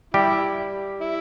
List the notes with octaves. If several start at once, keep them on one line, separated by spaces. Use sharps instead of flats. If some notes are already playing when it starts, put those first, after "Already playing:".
G3 E4 G4
E4